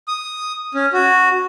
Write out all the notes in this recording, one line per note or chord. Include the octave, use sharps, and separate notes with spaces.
D#6
C#4
F#4